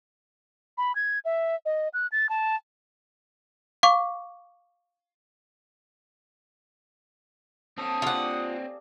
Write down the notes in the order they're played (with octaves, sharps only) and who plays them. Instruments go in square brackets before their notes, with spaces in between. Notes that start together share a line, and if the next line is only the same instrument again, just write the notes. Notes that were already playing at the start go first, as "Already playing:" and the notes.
[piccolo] B5
G#6
E5
D#5
F#6
A6
A5
[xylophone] F5 C#6 D6
[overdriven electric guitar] C4 C#5 [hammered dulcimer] A4 F5 [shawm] D#6
[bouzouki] F4 F#5 [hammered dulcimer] G4 G#4 D5